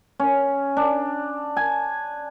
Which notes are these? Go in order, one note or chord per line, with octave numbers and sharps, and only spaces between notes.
C#4
D4
G#5